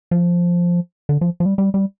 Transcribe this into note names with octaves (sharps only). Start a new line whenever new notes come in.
F3
D3
F3
F3
G3
G3
G3